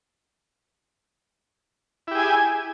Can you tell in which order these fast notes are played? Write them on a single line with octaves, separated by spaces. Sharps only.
E4 G4 G#4 G#5